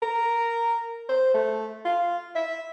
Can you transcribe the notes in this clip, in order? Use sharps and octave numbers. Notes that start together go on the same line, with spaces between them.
A#4
C5
A3
F4
E5